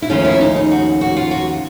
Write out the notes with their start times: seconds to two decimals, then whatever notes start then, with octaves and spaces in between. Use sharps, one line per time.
0.02 E4
0.10 D#2 C#3 F3 A3 C#4 F4
0.25 E4
0.41 D#4
0.56 D#4
0.71 F#4
1.01 F#4
1.16 F4
1.31 F#4